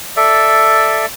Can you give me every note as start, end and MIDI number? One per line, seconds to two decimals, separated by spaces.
0.17 1.06 69
0.17 1.06 74
0.17 1.06 76